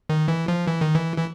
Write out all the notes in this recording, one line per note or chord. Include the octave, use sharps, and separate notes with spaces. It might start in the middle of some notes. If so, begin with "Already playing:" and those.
D#3
E3
F3
E3
D#3
E3
E3